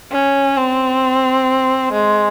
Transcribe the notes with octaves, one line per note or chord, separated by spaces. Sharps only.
C#4
C4
G#3